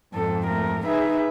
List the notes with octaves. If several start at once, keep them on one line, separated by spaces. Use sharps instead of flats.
F2 G#2 A4
A3 A#4
D#4 G#4 B4 E5